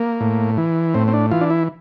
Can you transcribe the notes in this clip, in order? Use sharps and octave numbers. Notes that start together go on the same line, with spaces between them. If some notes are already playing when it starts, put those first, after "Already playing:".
Already playing: A#3
A2
E3
A2 C4
C4
D4
E3 F4
D4
E4